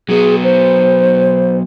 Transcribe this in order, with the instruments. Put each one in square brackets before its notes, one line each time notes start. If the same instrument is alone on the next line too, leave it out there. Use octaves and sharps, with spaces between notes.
[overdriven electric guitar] F#3 B3 [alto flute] G#4
[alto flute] C5